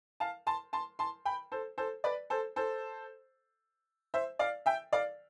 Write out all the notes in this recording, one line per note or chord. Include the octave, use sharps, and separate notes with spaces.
F5 A5
A5 C6
A5 C6
A5 C6
G5 B5
A4 C5
A4 C5
B4 D5
A4 C5
A4 C5
C5 E5
D5 F5
E5 G5
D5 F5